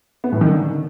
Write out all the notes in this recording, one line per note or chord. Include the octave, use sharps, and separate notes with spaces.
B3
A2
D#3
D3